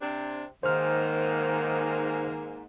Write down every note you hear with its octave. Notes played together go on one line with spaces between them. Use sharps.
C3 D4
G#2 D#3 A#3 C5 F6